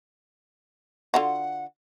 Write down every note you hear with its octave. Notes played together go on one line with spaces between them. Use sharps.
D3 F4 F#4 F#5